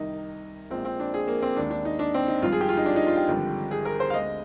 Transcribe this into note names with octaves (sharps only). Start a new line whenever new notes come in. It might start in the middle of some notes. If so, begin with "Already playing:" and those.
Already playing: C2 C3 D#3 D#4
A#1 A#2 F3 G#3 C4
C4
D4
G#4
A#3
C4
D#2 D#3 G#3 D4
D4
D#4
D4
C4
D#4
G#1 G2 F3 F4
G#4
G4
F4
D#4
D4
D#4
F4
G4
G#1 G2 D3 F3
G#4
A#4
C5
F5
D2 D3 G#3 D#5